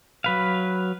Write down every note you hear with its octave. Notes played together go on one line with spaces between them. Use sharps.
F#3 B4 F5